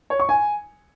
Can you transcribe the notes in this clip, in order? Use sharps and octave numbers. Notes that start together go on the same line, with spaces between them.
C#5
C#6
G#5